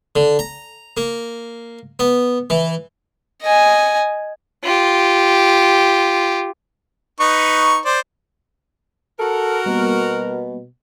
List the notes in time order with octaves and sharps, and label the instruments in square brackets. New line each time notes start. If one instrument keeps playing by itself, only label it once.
[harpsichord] D3
A#5
A#3
B3
E3
[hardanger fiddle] D#5 G#5
F4 G4
[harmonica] D#4 B4 C#6
C5 D5
[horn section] F#4 A#4 [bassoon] A4
[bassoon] B2 [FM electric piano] G3 A#3 B3